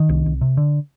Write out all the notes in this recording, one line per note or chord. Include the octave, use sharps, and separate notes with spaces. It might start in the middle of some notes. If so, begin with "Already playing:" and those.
Already playing: D#3
C2
C2
C3
D3